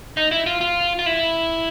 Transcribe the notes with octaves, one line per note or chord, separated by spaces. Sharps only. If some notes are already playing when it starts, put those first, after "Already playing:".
D#4
E4
F4
F4
F4
E4